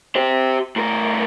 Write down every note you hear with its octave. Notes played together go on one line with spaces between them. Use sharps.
G4 C5
A2 A#4